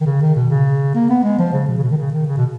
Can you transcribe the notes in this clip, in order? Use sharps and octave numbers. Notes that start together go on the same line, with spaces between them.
D#3
C#3
D#3
B2
C#3
A#3
B3
G#3
F3
C#3
B2
C#3
B2
D#3
C#3
D#3
C#3
B2